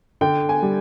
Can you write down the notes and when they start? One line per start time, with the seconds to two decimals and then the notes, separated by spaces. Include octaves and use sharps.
0.21 D3 G5
0.49 G#5
0.63 G3